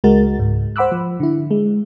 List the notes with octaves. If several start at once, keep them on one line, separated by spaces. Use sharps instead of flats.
C#2 G#3 F#4 A#4 A6
C#2 G#2
C5 F#5 B5 D6 E6 F#6
F3
D3 E4
G#3